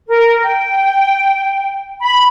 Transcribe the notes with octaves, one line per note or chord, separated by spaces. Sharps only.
A#4
G5
B5